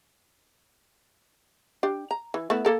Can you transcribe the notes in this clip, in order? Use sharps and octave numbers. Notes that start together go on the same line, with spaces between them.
D4 G4
A#5
E3
A3 B3 E4
A#3 A4 A#4